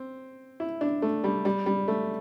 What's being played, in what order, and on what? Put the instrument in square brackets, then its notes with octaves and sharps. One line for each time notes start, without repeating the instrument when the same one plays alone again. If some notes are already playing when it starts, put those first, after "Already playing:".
Already playing: [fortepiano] C4
E4
D4
A3
G3
G3
G3
A3